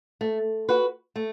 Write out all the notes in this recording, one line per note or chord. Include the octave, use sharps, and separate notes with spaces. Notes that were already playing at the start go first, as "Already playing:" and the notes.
A3
F#4 B4
A3